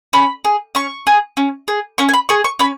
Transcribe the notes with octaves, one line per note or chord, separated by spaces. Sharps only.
C#4 B5
G#4
C#4 C#6
G#4
C#4
G#4
C#4 C#6
G#5
B5
G#4 C#6
C#6
C#4 B5